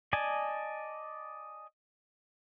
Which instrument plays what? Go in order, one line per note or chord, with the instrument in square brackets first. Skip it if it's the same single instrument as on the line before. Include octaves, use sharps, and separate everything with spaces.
[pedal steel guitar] D5 D#5 G#5 A5